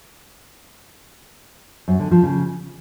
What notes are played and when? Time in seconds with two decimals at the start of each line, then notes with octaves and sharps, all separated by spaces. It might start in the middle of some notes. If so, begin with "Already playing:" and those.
1.88 F#2
2.00 D3
2.11 F3
2.23 C#3